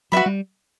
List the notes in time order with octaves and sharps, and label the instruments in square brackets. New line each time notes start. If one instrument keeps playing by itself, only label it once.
[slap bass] F#3 [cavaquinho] F#4 B4 E5 B5
[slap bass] G3